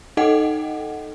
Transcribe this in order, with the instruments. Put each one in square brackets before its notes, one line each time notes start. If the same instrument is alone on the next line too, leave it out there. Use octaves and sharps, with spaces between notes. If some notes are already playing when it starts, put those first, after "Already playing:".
[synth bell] D#4 A4 D#5 F#5 G5